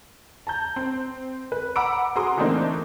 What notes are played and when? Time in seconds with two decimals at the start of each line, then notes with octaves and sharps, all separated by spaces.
0.47 A5 A#5 G6
0.76 C4
1.52 B4
1.76 F#5 A#5 B5 D6 E6 D7
2.16 F#4 G#4 A#5 C6 D#6
2.37 E3 A3 A#3 C4 D4 D#4